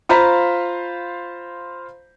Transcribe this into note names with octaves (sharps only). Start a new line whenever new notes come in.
F4 C5 F5 A#5 B5 B6